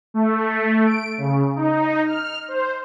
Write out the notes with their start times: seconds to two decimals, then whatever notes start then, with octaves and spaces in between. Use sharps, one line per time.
0.14 A3
0.86 D7
1.18 C#3
1.56 D#4
2.05 F6
2.48 C5